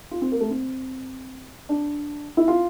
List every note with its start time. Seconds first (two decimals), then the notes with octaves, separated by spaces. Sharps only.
0.11 F4
0.22 C4
0.31 A#3
0.40 A3
0.51 C4
1.69 D4
2.37 E4
2.48 F4